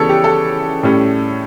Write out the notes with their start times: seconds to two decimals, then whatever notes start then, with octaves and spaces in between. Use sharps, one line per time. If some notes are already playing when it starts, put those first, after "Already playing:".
Already playing: C#3 E3 G3 B3 A4 C#5
0.09 G4
0.24 A4
0.83 A2 G3 C#4